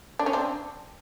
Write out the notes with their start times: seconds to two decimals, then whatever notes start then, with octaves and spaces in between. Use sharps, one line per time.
0.19 D4
0.26 C#4
0.33 C4 D4